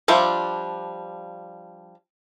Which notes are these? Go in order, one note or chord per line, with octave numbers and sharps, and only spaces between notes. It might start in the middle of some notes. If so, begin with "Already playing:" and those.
F3 G3 D4 F4 E5